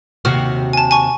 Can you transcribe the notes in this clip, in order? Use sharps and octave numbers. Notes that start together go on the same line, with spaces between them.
D#2 C3 F#4 F6
G#5 A5
G#5 A5 C#6